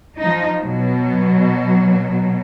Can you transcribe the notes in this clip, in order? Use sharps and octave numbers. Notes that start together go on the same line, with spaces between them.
F3 D#4
B2 F#3